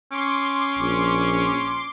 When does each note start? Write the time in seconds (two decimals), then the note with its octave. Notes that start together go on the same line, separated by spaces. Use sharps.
0.11 C#4 C6 D6
0.79 A#1